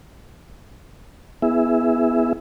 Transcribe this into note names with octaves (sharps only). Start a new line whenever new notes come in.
B3 E4 G#4 E5